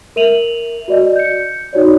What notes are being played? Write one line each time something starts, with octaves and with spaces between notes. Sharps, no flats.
A#4 E5 D#7 F7 F#7
F#4 D5 D#5
G6 C#7
D#4 F#4 C#5 D5